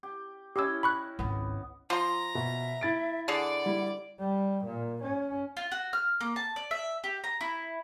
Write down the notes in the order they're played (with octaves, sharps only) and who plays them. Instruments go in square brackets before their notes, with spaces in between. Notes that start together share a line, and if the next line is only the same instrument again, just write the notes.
[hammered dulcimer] G4
[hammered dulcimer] C#4 E4 D#5 [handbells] G4 E6
[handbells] B5 C#6 F#6
[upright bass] G#1 C#2 [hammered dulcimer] B3
[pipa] F3 C6 [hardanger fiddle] A#5
[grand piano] B2 [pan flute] E5
[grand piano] E4 A6 D7
[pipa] D3 G#4 [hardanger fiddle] D5 D6 [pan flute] F#5
[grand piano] G3 E4
[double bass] G3
A#2
C#4
[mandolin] F4
F#4
F6
A#3
A5
D5
E5
G4
A#5
E4